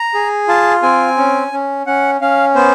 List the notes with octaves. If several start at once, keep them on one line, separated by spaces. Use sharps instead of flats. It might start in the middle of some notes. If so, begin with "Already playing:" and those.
Already playing: A#5
G#4
F4 A5
C4 G#5
C#4
C#4
C#4 F#5
C#4 F5
B3 C5